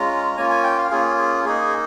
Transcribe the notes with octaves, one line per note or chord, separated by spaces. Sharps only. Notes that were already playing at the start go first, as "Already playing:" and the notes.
Already playing: G#3 C#4 F4 A#5
A#3 C#4 F4 G#5
G#5
G5
F5
A#3 C#4 F4 G#4
G#4
A#3 D#4 G#4